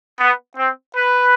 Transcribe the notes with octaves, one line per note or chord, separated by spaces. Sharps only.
B3
C4
B4